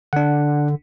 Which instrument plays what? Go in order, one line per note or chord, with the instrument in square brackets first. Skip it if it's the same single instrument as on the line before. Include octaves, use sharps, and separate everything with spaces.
[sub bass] D3 [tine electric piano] D4 F#5